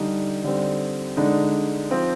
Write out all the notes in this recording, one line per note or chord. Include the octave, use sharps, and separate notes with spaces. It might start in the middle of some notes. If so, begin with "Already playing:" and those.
Already playing: D3 G3 D4 D#4
D3 G3 C4
D3 G#3 D4 D#4
F3 C4